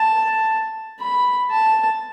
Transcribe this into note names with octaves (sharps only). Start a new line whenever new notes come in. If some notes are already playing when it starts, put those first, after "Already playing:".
Already playing: A5
B5
A5